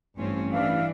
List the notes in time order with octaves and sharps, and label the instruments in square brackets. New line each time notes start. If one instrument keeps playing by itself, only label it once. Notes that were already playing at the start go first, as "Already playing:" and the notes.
[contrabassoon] A1 [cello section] G2 C4 C#4
[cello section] E3 G3 D4 [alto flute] F5